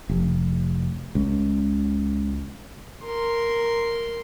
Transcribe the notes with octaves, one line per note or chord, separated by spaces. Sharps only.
F1
C#2
A#4 C6